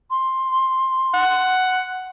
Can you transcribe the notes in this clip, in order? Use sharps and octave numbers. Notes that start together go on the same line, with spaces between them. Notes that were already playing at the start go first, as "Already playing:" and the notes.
C6
F#5